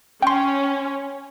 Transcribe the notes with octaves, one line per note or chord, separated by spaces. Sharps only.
C#4 G5 C6